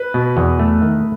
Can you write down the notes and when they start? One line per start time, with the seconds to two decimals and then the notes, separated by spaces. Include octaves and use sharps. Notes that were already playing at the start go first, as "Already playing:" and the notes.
Already playing: B4
0.14 B2
0.37 E2
0.59 A3
0.82 D#3